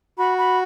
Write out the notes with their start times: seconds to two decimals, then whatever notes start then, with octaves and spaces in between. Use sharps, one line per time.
0.18 F#4 B5
0.38 B5